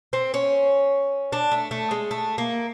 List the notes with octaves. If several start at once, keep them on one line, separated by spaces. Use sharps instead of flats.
C4
C#4
D4
A3
A3
G#3
A3
A#3